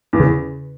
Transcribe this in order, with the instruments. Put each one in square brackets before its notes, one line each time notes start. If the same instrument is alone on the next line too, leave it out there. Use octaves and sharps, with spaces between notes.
[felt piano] E2
[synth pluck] C#3